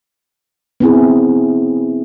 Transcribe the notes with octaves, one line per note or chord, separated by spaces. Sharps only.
B3 C4 E4 G#4